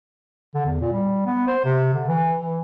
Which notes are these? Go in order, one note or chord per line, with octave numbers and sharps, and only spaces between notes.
D3
E2
A#2
G3
B3
C5
C3
D3
E3
E3